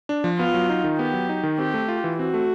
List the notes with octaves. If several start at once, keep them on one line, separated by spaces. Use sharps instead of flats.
D4
F3
B3 F4
F#3
D#4
D#3
B3 G4
F#3
D#4
D#3
C4 G4
A3
F4
E3
C4 F#4
A3